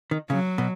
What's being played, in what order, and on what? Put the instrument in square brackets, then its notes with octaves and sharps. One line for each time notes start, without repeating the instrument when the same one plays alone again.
[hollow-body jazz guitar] D#3
[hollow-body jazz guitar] C#3 [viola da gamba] F#3
[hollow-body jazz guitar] B2